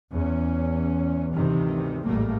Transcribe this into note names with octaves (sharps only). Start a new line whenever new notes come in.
E2 C#4
D2 G2 C3 D#3 E3
A1 G#2 G3 A3 A#3